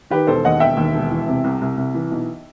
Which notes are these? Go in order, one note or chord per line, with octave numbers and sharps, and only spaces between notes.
D#3 G4 B4
E1 A4 C5
D#2 D#5 F#5
E1 E5 G5
D#2
E1
E3
C3
C2
C2
C2
E3
B1